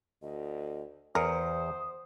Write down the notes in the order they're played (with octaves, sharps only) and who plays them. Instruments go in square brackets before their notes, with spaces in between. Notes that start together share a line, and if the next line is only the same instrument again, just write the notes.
[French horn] D2 [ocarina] D#5
[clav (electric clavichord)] E2 [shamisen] A#4 [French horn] C5 [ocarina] D#6